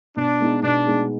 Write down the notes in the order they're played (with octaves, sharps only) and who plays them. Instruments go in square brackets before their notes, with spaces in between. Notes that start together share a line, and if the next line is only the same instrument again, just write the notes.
[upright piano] B2 [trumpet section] D4
[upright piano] G#3 B3 D#4
[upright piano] B2 [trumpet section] D4
[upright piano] G#3 B3 D#4